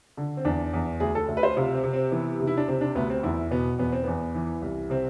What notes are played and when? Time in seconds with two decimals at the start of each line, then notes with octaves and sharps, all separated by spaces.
0.17 D3
0.37 C4
0.45 E2 D4
0.74 E2
1.00 D2 G#4
1.15 A4
1.28 D2
1.37 B4
1.43 C5
1.56 C3 F4
1.75 C4
1.84 C3
1.93 C4
2.12 E3 B3
2.40 C3
2.47 E4
2.57 D4
2.68 C3 C4
2.81 D4
2.95 D2 B3
3.10 C4
3.23 E2 E4
3.51 B2 B3
3.79 E2 B3
3.92 C4
4.04 E2 B3
4.35 E3
4.62 C2
4.90 C3 C4